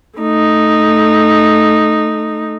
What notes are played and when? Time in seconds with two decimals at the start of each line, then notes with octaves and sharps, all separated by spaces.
0.19 A3 D#4